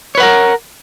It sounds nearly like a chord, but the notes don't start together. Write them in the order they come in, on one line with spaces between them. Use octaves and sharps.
C#5 B4 F#5 A#4